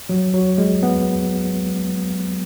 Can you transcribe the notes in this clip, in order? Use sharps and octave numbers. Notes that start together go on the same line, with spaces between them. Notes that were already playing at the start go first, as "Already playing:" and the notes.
F#3
F#3
G#3
B3